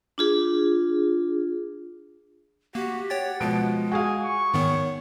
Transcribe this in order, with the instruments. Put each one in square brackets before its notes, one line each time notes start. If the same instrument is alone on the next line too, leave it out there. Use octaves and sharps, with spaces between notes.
[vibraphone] D4 F4 G#4
[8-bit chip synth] A#3 [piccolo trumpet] F#4 [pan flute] G4
[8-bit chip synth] C#5 G5 A6 [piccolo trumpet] F#5
[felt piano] B2 F3 D7 [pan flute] G#3
[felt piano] F#4 G#4 F5 [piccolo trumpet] G#5
[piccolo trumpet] C#6
[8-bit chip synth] G#2 D#3 B3 [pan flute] C#5